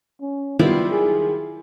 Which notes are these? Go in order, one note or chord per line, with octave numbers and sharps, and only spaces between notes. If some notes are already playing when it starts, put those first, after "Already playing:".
C#4
D#3 F#3 G3 B3 E4 F4 D5
G#4